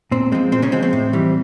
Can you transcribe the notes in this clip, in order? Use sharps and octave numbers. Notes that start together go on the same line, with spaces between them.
A#2 C4
F3 G#3 C4
A#2 C4
C#3 C#4
F3 G#3 C4
C4
A2
E3 G3